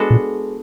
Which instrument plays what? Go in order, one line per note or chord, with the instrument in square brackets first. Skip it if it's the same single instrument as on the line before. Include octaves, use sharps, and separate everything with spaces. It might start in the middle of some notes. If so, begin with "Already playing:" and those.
Already playing: [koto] G#3 B3 D4 F#4 A4
[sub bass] A#2